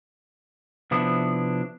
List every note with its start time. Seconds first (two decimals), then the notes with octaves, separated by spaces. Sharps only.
0.91 C3 F3 B3 D4 E4